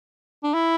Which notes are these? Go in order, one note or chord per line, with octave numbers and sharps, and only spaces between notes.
D4
E4